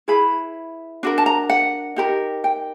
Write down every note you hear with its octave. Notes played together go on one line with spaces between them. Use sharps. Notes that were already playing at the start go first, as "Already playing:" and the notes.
E4 G#4 B4 B5
D4 F#4 A#4
A5
A#5
F#5
D#4 G4 A#4
G5